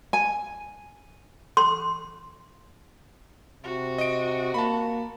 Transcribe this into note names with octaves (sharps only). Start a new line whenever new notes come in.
G#5
C6
C3 F#4
D#5 D7
A#3 A5 B5